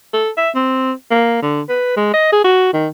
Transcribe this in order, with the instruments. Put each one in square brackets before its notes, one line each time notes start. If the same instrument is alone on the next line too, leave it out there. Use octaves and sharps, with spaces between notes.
[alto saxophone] A4
E5
C4
A#3
D3
B4
G#3
D#5
G#4
F#4
D#3